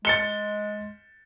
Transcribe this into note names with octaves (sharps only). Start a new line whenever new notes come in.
G#3 A6 C#7 G7